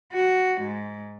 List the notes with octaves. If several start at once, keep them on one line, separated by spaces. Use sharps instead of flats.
F#4
G#2